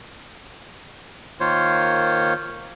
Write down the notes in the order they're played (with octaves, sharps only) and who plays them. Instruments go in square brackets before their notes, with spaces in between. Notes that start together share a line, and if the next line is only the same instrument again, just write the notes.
[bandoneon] D#3 A#3 F4 C5 C#5